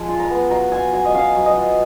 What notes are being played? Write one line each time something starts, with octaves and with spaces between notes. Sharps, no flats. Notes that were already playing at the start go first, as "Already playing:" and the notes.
Already playing: F3 G#3 G#5
F4
A#5
B3
F#3 A#5
F4 G#5
F#3 G#5
D#5
C#4 F5
F#3
D#5
F4